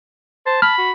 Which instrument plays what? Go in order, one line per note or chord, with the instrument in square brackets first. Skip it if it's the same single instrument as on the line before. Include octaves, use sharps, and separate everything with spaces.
[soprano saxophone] C5 [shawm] A5
[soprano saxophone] A5 [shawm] B5 [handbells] F6
[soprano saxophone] F#4